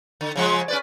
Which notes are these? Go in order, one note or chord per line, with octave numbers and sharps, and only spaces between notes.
D3
C#3 F3 G#3
C#4 B4 D5